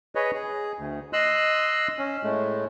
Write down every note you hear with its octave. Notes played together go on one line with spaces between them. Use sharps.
G#4 B4 C#5 D#5
G#4
D2
D#5 C6 E6 F#6
C#4
A2 G#3 A3